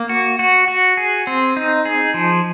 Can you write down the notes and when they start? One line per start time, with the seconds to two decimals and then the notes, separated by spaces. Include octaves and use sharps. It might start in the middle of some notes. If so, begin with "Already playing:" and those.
Already playing: A#3
0.09 F#4
0.39 F#4
0.68 F#4
0.97 G#4
1.27 C4
1.57 D#4
1.85 G#4
2.14 F3